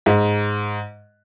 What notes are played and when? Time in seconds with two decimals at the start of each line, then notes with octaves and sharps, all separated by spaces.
0.06 G#2